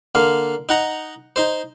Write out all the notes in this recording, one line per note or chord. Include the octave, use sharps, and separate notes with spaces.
D3 A#3 F5
D#4 F#5 A#5
D#4 C5